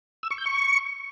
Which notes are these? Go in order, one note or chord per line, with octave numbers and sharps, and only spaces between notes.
E6
C#6
G6
C#6